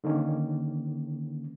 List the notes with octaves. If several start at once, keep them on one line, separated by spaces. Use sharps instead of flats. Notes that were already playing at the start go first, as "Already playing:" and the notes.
D3 D#3 A#3 C#4